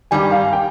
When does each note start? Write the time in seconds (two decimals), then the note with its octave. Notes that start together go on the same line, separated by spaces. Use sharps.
0.11 G2 D#3 G3 G#5
0.32 F5
0.53 G5